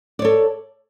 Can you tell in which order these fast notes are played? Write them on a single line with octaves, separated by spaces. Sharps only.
D5 C#5 A4